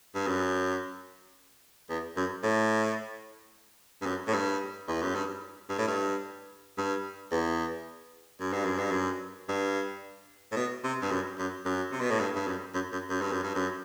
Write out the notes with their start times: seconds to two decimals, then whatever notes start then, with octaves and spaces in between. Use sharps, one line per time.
0.15 G2
0.27 F#2
1.90 E2
2.16 F#2
2.43 A2
4.01 G2
4.06 F#2
4.27 A2
4.34 G2
4.88 E2
5.02 F#2
5.15 G2
5.69 G2
5.78 A2
5.88 G2
6.78 G2
7.32 E2
8.40 F#2
8.53 G2
8.65 F#2
8.79 G2
8.91 F#2
9.49 G2
10.52 A2
10.56 B2
10.84 C3
11.02 G2
11.11 F#2
11.38 F#2
11.65 F#2
11.92 C3
12.01 B2
12.10 A2
12.20 G2
12.36 G2
12.47 F#2
12.74 F#2
12.92 F#2
13.10 F#2
13.22 G2
13.32 F#2
13.43 G2
13.55 F#2